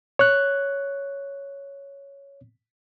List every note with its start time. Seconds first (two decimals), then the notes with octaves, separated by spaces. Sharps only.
0.19 C#5 F#6